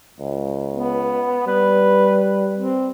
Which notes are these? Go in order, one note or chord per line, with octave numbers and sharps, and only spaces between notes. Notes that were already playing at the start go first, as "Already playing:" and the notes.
C#2
B3
G3 B4
C4